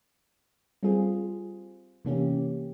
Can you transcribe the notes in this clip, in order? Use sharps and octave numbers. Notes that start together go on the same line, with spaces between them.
G3 C4 F4 G#4
C3 E3 A#3 C#4 G4